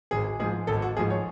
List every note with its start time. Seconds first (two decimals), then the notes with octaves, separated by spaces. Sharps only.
0.11 G#1 G#4
0.40 G#2 F3 G#4
0.67 G#1 A4
0.82 F#4
0.97 G#2 F3 G#4
1.10 C#5